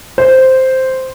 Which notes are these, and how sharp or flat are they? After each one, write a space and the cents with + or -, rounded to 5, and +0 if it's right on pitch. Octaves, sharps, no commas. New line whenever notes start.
C5 -5